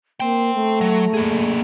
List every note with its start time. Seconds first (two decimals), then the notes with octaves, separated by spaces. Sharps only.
0.20 A#3 C5 G5
0.54 A3
0.81 F#3
1.14 A#3 G#4